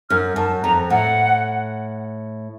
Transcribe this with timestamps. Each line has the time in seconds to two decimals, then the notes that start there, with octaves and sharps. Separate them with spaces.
0.10 F#2 F6
0.36 F#2 A5
0.63 F2 A#5
0.90 A2 F#5